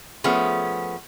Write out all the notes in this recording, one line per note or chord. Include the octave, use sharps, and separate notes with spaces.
F3 A3 B3 C#4 G#4